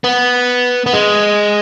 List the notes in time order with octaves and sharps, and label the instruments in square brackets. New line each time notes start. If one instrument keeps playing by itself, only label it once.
[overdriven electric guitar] B3
B3
G#3